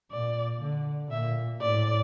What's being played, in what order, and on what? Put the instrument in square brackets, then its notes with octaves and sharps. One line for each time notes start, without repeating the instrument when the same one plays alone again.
[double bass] A#2 [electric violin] D5
[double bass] D3
[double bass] A#2 [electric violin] E5
[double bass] A2 [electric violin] D5